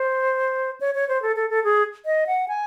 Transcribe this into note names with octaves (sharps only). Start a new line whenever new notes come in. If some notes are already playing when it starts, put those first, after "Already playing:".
Already playing: C5
C#5
C#5
C5
A4
A4
A4
G#4
D#5
F#5
G#5